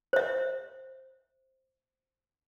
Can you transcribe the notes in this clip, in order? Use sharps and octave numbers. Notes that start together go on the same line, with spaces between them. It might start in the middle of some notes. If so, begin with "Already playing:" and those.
C5 E5